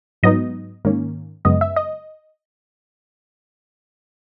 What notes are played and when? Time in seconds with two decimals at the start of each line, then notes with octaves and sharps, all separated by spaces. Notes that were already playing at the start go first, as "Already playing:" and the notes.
0.23 G#2 F#3 B3 D#4 D#5
0.85 G#2 D#3 A#3 C#4
1.45 F#2 C#3 G#3 B3 D#5
1.61 E5
1.76 D#5